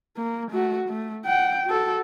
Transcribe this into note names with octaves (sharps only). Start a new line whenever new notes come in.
A#3
A3 F#4
A3
F#5 G5
F#4 A4